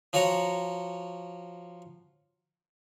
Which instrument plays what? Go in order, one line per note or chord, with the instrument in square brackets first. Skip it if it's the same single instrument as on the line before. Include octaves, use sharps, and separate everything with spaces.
[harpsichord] F3 F#4 C#5 F#5 A#5